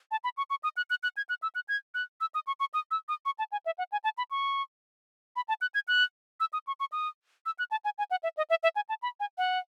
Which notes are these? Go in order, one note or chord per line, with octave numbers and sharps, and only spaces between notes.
A5
B5
C#6
C#6
D#6
F#6
F#6
F#6
G#6
F#6
E6
F#6
G#6
F#6
E6
D#6
C#6
C#6
D#6
E6
D#6
C#6
A5
G#5
E5
F#5
G#5
A5
B5
C#6
B5
A5
F#6
G#6
F#6
E6
D#6
C#6
C#6
D#6
E6
F#6
A5
G#5
G#5
F#5
E5
D#5
E5
E5
G#5
A5
B5
G#5
F#5